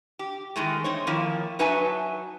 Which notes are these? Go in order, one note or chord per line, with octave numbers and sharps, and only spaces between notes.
G4
D#3 E3 G#3 A3
C4 D#4 C#5
D#3 F3 A#3 E4
F#3 D#4 B4 E5 G#5 A5